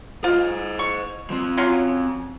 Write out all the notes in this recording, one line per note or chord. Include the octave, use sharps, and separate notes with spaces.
F4 C5 D#5
C#6
F3 C4
F#3 C#4 F4